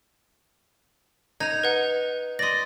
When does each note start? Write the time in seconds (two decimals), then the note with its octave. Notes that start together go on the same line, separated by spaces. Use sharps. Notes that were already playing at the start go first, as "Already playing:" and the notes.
1.40 D#4 G#6 F7
1.64 B4 F#5
2.39 D5 D#5 C6 A#6